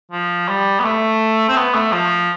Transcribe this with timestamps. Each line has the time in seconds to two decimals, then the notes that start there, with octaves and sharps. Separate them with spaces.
0.12 F3
0.49 G3
0.80 B3
0.84 A3
1.49 C4
1.56 B3
1.74 A3
1.93 F3